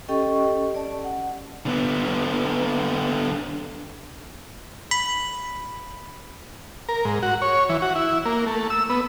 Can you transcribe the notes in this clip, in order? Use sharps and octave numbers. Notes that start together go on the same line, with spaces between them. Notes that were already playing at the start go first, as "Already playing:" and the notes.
C#4 G4 A4 D#5 G5 C#6
D5 A5
F#5
D3 B3
B5
A#4
G#2
F#4
C#5
E3
F#4
E4
A#3
A3
E6
B3